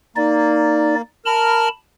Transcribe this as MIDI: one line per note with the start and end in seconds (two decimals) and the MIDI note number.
0.16 1.02 58
0.16 0.95 63
0.16 0.95 74
1.26 1.68 70
1.26 1.68 81
1.26 1.68 83
1.26 1.68 89